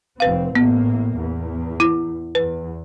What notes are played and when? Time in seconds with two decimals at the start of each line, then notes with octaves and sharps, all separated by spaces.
0.20 F1 C4 B4 F5
0.55 A1 A2 A#3 B3
1.16 E2
1.80 E4
2.35 E2 B4